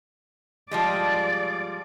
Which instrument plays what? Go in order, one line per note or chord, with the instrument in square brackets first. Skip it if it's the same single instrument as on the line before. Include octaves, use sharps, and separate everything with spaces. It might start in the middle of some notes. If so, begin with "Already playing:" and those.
[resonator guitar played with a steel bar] F3 G3 G#3 [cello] D5